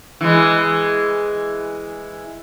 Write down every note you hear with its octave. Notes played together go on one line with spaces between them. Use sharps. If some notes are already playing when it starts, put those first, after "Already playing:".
E3 G#3